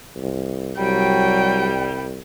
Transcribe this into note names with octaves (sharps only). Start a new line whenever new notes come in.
C2
C2 F#3 G3 G5